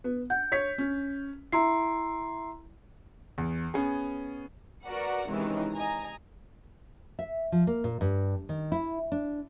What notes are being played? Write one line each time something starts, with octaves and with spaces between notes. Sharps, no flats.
B3
F#5 G6
C#5 B6
C#4
E4 A#5 C6 C7
E2
B3 C#4 G#4
F#4 A#4 B4 D5 F#5
C3 D#3 E3 G#3 C#4
D#5 G#5 A#5
E5
F3
A#3
A#2
G2
D#3
E4
D4